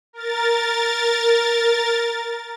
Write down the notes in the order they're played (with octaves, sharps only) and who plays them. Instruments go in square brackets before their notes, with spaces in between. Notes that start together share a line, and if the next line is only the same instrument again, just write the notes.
[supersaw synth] A#4 A6